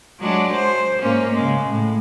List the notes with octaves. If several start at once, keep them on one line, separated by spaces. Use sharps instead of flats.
F#3 G#3 D4
C5
G#2 A#3 C#4
C#3 G#3
A2